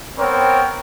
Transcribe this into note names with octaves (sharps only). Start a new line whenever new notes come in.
B3 C4 A#4 C#5 G5